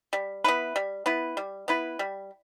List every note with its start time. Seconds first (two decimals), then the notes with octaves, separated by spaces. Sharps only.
0.13 G3
0.44 B3 E4 B4
0.76 G3
1.06 B3 E4 B4
1.37 G3
1.68 B3 E4 B4
1.99 G3